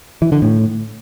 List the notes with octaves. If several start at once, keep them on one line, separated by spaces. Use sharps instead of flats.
E3
D3
A2